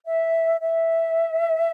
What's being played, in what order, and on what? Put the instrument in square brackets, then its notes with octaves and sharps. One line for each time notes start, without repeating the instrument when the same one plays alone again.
[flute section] E5
E5